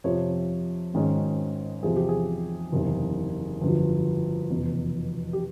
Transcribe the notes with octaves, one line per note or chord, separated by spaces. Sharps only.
F2 C3 F3 C#5
G#1 G#2 D#3 G#3 C#4
E2 C3 F3 G#4
G4
G#4
F#1 E2 C3 D#3
G1 F2 D3 F#3
F1 E2 B2
G4